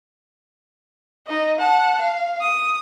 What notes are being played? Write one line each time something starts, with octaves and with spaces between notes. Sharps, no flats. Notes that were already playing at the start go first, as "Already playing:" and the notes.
D#4 D#5
F#5 A5
F5
D#6